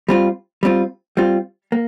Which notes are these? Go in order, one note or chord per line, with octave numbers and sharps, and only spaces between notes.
G3 C4 F4
G3 C4 F4
G3 C4 F4
A#3